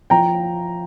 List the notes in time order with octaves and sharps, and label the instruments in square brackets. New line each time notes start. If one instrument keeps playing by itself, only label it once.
[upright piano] F3 G5 A#5